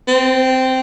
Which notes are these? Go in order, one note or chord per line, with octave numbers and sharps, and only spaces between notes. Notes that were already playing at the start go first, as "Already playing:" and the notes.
C4